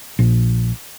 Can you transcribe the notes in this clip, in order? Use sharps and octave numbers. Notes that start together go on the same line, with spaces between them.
A#1